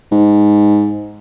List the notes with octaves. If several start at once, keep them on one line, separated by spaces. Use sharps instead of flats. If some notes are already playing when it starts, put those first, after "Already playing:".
G#2